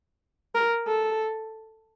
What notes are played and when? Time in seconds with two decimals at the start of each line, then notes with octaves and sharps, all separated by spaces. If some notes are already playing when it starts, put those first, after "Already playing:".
0.55 A#4
0.87 A4